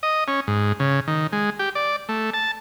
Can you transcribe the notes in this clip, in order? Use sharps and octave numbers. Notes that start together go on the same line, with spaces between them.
D#5
C#4
G#2
C#3
D#3
G#3
G4
D5
A3
A5